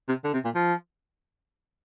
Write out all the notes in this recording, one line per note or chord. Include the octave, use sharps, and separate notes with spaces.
C3
D3
C3
A#2
F3